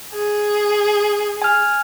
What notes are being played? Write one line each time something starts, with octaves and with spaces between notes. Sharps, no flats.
G#4
G#5 F6